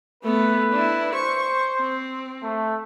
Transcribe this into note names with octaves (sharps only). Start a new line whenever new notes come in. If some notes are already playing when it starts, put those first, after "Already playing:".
A3 B3 B4
D4 E4
C5 C#6
C4
A3